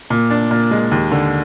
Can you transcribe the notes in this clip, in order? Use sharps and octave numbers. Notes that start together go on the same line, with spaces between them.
A#2
D4
A#2
G#3
D#2
D3